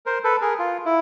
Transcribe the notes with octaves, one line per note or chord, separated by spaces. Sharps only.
A#4 C5
A4 B4
G#4 A#4
F4
E4